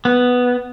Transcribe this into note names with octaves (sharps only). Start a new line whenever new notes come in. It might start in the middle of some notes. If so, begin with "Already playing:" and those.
B3